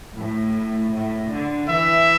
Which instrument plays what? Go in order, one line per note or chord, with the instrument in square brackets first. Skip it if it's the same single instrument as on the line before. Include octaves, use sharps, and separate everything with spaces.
[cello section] A2
A2
D3
[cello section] E3 [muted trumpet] E5